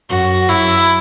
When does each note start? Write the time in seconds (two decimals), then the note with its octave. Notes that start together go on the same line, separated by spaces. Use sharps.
0.10 F#2 F#4
0.48 F#2 E4